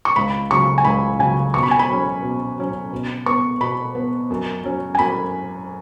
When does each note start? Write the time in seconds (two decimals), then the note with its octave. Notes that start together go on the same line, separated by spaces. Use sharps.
0.05 C#6
0.16 C#2 B5
0.51 C#3 F#3 C#6
0.78 G#5
0.85 C#2 B5
1.19 C#3 F#3 G#5
1.54 B2 C#6
1.63 B5
1.71 G#5
1.79 B5
1.88 F#3 C#4
2.22 B2
2.58 F#3 C#4
2.92 B2
3.26 B3 C#6
3.60 B2 B5
3.95 B3
4.30 F#2
4.64 F#3 C#4
4.95 G#5
4.99 F#2 B5